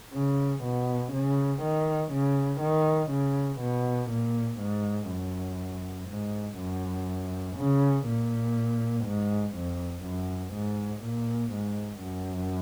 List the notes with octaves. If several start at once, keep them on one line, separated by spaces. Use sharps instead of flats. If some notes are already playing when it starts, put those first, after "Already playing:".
C#3
B2
C#3
D#3
C#3
D#3
C#3
B2
A#2
G#2
F#2
G#2
F#2
C#3
A#2
G#2
F2
F#2
G#2
A#2
G#2
F#2